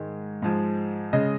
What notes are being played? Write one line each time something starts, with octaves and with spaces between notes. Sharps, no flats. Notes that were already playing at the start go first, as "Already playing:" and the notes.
Already playing: G#2 D#3 G#3
G#2 F3 G#3
C#3 G#3 D#5